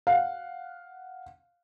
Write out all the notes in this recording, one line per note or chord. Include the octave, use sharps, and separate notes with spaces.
F5 F#5